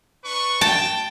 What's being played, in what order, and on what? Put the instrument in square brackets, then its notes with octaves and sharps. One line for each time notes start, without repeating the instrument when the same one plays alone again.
[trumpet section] D4 B4 C#6
[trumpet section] G5 [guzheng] A5